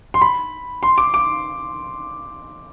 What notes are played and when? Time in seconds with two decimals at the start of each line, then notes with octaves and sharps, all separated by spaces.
0.14 C6
0.22 B5
0.83 C6
0.98 D6
1.14 D6